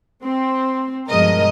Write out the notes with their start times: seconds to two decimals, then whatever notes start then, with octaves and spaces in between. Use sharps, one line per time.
0.23 C4
1.09 G2 B2 F3 G#3 A#4 D#5